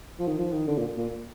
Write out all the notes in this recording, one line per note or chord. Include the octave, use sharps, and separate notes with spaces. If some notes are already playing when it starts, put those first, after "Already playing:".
F3
D#3
F3
D#3
D3
A#2
A#2